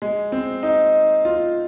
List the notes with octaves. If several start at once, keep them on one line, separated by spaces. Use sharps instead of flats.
G#3
C4
D#4
F4